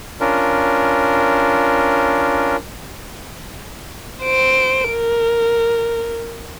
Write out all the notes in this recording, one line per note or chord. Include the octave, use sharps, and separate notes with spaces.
C#4 D4 F4 A#4
C5 D7
A#4